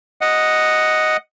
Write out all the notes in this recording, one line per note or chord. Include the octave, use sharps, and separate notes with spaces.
D#5 F#5